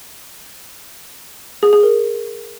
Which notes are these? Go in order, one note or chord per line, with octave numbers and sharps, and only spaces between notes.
G#4
G#4
A#4